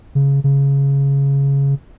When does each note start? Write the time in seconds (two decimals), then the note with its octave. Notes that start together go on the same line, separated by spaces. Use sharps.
0.15 C#3
0.44 C#3